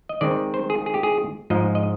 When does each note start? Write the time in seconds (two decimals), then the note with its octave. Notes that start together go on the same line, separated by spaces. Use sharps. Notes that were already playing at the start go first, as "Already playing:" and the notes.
0.09 D#5
0.21 D#3 G#3 C4 D5
0.54 C5
0.70 G#4
0.86 G#4
0.94 G4
1.03 G#4
1.50 G#2 F3 G#3 D#5
1.75 D#5